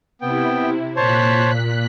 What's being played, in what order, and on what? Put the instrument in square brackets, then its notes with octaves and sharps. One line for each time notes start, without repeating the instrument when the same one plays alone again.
[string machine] C3 E4 [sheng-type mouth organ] B3 G5
[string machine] A#2 F#6 B6 [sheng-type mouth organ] C5 C#5 A5